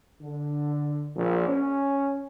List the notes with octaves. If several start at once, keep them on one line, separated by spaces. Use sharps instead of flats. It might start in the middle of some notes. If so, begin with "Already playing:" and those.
D3
A#1
C#4